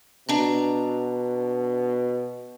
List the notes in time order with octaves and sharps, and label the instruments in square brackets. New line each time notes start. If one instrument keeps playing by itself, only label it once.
[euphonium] B2 [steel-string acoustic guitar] D4 A#5